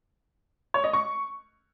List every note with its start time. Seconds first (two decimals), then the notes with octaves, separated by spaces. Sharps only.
0.74 C#5
0.84 D#5
0.93 C#6